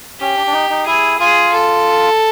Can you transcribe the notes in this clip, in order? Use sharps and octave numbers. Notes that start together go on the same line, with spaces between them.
C#4 G4
D4
D4
D#4
D#4
E4 G#4
F4 G#4
A4